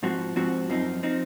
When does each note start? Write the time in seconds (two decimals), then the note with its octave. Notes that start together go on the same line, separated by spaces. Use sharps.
0.03 G#2 F3 C4 F#4
0.36 G#2 F3 C4 F#4
0.69 F#2 F3 C4 D#4
1.03 F3 C4 D#4